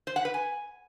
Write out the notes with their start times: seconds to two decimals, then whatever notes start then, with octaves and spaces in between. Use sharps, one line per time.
0.07 C5
0.16 F#5
0.25 B4
0.34 G#5